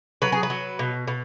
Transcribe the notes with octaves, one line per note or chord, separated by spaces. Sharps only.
F#3 B4
G#4
B4
F#3
B2
B2